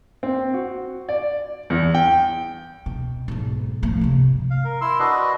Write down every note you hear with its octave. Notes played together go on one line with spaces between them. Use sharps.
C4
F#4
D5
E2
G5
B2
B1 G#2
F3 A3
G2 C3
F5
A#4
E4 C6 E6
D4 F#4 B4 D#5